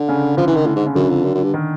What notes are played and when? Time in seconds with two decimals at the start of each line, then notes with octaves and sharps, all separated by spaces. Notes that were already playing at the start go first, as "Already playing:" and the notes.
Already playing: D3
0.08 C#3
0.37 D3 F3
0.47 E3
0.56 D#3
0.66 A2
0.76 G#2
0.86 C#3
0.95 F#2 D3
1.10 F2
1.25 F#2
1.35 F#2
1.43 G2
1.54 D#3